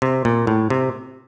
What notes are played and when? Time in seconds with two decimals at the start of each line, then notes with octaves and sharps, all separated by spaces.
0.02 C3
0.25 A#2
0.47 A2
0.70 C3